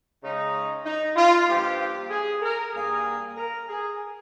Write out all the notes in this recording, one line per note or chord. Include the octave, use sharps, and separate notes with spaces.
C#3 G#3 D#4
D#4
F4
G2 F3 A#3 G4
G#4
A#4
G2 G3 A#3 G#4
A#4
G#4